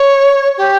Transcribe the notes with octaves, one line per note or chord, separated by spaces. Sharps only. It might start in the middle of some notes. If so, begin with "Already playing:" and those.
Already playing: C#5
G4